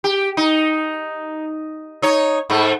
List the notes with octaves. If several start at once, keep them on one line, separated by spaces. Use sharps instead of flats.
G4
D#4
D#4 C#5
G#2 A3